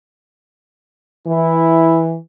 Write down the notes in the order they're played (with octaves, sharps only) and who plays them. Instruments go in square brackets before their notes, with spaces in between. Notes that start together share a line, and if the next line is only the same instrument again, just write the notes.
[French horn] E3 [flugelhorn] E4